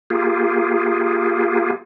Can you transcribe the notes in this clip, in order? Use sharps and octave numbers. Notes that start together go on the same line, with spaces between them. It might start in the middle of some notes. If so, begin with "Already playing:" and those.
A#3 F4 G4 G#4